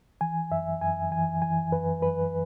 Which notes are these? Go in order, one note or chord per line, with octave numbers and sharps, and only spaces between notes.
E3 G#5
F#2 E5
F#2 G#5
E3 G#5
E3 G#5
F#2 B4
F#2 B4